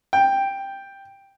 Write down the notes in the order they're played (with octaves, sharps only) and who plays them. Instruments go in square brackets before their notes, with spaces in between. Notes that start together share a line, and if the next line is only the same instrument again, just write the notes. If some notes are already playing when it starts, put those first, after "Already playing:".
[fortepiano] G5